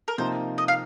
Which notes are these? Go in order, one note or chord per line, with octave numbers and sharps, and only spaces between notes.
A#4
C3 F3 A#3 D#4 C5
D#5
F5